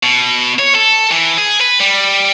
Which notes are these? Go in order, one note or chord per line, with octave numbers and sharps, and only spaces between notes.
B2
C#5
A4
E3
G#4
B4
G3